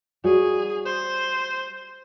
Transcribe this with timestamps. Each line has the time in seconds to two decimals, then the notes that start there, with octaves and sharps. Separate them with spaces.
0.24 G3 F#4 G#4 C#5
0.85 C5